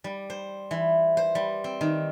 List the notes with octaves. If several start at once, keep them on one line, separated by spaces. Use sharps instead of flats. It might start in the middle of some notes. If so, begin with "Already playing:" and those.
G3
C5
E3
C5
G3
C4
D#3